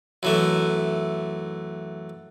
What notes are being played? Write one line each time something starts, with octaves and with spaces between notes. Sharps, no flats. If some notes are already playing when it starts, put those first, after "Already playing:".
F#2 E3 A3